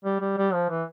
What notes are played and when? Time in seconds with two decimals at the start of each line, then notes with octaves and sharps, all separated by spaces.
0.05 G3
0.20 G3
0.38 G3
0.53 F3
0.69 E3